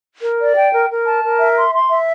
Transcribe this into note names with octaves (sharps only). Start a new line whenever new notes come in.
A#4
D5
G5
A#4
A#4
A5
A#4
E5
C6
C6
E5